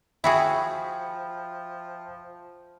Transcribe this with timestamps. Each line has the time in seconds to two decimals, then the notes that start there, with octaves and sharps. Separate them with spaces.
0.24 F3 E4 F#4 G#4 E5 G5 B5